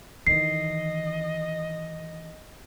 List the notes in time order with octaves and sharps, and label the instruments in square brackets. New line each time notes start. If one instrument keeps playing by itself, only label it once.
[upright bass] D#3 E3 [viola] D#5 [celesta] C7